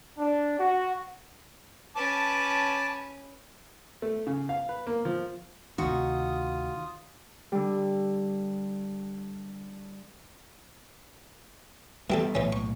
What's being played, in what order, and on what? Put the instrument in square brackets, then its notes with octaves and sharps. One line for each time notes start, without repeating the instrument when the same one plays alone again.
[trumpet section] D4
F#4
[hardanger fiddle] C#4 B4 [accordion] A5 D6
[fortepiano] A3
C#3
F5
B4
A#3
F3
[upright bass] D2 C3 [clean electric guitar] D#3 D#4 [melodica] F4 D#6 [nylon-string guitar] F#4
[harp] D3 G3
[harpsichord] E3 G4 A4 [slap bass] G3 B3
[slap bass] B1 A2 [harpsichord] E3 C#4
[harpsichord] C#6